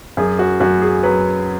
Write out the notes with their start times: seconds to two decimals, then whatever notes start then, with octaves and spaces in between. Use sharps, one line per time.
0.17 F#2 G#4
0.39 F#4
0.60 F#2 F#4
0.82 G#4
1.03 F#3 B4